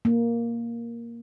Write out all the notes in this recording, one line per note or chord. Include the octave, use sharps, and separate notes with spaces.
A#3